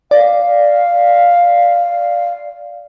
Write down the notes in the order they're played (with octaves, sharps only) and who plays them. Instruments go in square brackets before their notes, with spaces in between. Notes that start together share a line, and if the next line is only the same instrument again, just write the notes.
[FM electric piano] D5 [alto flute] F5